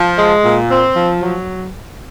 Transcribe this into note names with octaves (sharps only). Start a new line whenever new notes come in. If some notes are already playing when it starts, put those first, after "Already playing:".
Already playing: F3
G#3
A#2
C4
F3
F#3